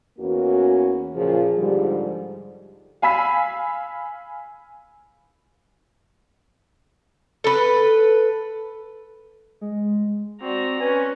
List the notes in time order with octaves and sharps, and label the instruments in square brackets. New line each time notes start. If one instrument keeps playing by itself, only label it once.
[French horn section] E2 E3 A#3 C#4 F#4
A#2 C#3 F3 G#4
G#2 D3 F3 G3
[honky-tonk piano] F5 G#5 B5 E6 B6
[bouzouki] A4 B4
[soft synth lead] G#3
[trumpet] C4 [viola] F#4 [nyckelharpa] D5 A#5
[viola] C#4 [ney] B4 [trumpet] G#5